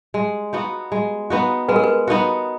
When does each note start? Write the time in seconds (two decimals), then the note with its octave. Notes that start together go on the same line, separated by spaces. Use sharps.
0.14 G#3
0.53 B3 D#4 F#4
0.92 G#3
1.30 B3 D#4 F#4
1.69 G#3 B4
1.76 A#4
1.84 B4
2.08 B3 D#4 F#4